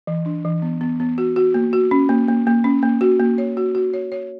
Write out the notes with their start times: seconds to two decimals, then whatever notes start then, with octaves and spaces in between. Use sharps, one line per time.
0.07 E3
0.26 D4
0.45 E3
0.62 B3
0.81 B3
1.00 B3
1.18 F#4
1.36 F#4
1.54 A#3
1.73 F#4
1.91 C#4
2.09 A#3
2.28 A#3
2.47 A#3
2.64 C#4
2.83 A#3
3.01 F#4
3.20 A#3
3.38 C#5
3.57 F#4
3.75 F#4
3.94 C#5
4.12 C#5